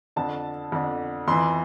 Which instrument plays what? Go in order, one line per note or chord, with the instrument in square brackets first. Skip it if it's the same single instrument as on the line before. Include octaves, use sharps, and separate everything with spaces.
[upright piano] F2 D3 A5
F2 D3
F2 E3 C6